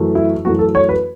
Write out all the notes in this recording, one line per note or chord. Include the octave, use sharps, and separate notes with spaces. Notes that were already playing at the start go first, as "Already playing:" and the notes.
Already playing: F#2 E3 A3
E4
F#2 E3 A3 F#4
A4
C#5
B4